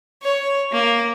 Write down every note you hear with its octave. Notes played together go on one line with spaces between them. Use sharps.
C#5
A#3